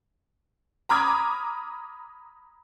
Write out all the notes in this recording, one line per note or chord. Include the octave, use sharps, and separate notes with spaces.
A#5 B5 D6 D#6 F6 G#6